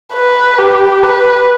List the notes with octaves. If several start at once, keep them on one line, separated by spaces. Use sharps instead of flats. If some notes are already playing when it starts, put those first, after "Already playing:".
B4
G4
B4